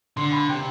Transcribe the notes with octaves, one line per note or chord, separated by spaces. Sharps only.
D3 C6
B5
C3 G5